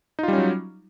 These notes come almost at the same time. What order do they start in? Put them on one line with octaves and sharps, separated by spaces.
D#4 F4 G3 C#4 F#3